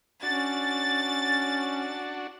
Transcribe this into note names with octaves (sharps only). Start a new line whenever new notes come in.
C#4 D4 F#4 A6